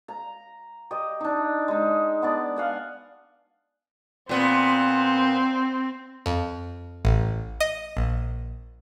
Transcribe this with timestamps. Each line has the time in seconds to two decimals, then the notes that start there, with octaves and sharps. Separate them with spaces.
0.08 A#5
0.91 G4 D#5
1.20 D4 D#4
1.68 G#3 D#4
2.22 B3 D4 D5
2.56 F5 F#5 G#5
4.29 A#2 B3 C4
6.26 F2
7.05 A1
7.60 D#5
7.97 A#1